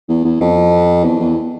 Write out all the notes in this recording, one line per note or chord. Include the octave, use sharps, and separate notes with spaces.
E2
E2
F2
E2
E2